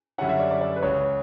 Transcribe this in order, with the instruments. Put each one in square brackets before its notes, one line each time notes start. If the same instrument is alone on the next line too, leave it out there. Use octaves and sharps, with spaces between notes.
[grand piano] F#2 D3 G3 C#4 E4 [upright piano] F#5
[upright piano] E5
D5
D5
D5
B4
[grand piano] C#2 C#3 E3 [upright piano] C#5